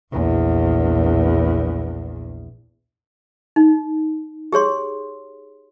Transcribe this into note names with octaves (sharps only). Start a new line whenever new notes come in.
A#1 E2
D#4
G4 G#4 C#5 C6